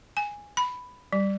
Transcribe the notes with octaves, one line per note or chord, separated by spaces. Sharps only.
G#5
B5
G3